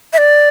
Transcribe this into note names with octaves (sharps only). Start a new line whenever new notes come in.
E5
D5